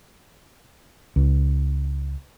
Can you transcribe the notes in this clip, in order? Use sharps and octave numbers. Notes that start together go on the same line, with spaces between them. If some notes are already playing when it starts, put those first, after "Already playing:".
C#2